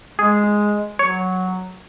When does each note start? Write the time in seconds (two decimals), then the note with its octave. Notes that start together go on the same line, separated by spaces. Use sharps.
0.18 G#3 G#4
0.99 F#3 C#5